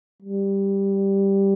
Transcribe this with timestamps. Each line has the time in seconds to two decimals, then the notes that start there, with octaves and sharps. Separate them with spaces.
0.22 G3